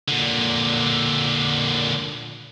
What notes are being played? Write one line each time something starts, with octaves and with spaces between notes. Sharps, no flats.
A#2 D3